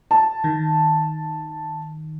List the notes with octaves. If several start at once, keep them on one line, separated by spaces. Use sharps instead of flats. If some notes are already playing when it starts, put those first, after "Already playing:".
A5
D#3